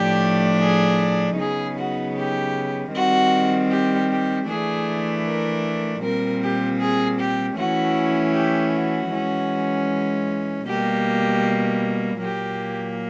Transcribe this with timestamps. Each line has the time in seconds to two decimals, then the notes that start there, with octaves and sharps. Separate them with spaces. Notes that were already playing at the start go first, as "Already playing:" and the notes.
Already playing: A2 F3 A3 D4 G4
0.61 G#4
1.38 C#3 F#3 B3 D#4 G#4
1.77 F#4
2.16 G4
2.93 D#3 G3 C4 F#4
3.70 G4
4.10 G4
4.48 E3 A3 D4 G#4
5.25 A#4
6.02 A#2 G3 C4 A#4
6.41 G4
6.80 G#4
7.19 G4
7.57 E3 A3 C#4 E4 F#4
8.34 G4
8.74 F#4
9.12 E3 G#3 C#4
10.68 B2 G3 A#3 G4
12.21 A#2 F#3 A#3 G4